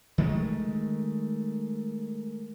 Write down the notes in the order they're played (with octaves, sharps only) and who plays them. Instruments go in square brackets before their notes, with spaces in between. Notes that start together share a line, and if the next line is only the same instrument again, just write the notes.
[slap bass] D#3 G#3 A3